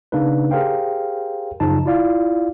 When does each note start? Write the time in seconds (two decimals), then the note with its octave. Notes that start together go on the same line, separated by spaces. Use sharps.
0.12 C#3 A#3 D4 D#4 B4
0.51 G4 G#4 A#4 C5 F5 G5
1.60 F#2 C#3 F3 D#4 A5
1.86 E4 F4 D5 F5